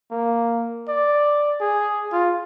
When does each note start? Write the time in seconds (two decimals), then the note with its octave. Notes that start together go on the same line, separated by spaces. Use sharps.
0.11 A#3
0.89 D5
1.61 G#4
2.12 F4